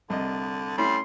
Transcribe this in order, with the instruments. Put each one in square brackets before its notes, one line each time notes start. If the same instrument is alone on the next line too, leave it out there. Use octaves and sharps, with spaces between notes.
[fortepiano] C2 D#5 [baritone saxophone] D3
[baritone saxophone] G3 [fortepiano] A3 C#4 E4 [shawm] C6